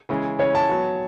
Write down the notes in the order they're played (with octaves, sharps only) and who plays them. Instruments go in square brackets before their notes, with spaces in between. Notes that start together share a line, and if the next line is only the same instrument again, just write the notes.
[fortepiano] C#3 E3 G#3 C#4
[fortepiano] C#3 E3 G#3 [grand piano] C#5
[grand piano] A5
[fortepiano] F#3 B3 F#4